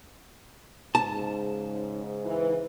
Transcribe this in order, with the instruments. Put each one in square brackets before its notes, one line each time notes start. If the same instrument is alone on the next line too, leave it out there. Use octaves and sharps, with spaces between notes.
[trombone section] G#2 C#3 [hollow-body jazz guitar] A5
[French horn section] E3